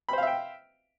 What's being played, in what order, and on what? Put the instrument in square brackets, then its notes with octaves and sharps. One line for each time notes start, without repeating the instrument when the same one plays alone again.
[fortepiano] B5
C5
F5
E5
G5